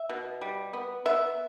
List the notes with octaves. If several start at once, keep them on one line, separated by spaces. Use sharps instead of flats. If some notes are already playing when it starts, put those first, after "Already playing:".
Already playing: E5
B2
G3
B3
B3 E5